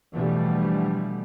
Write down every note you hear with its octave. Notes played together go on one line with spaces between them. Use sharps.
B2 D3 E3 F3 G3 A3